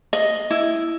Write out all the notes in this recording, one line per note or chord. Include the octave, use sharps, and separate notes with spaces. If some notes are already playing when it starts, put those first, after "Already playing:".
D#5
E4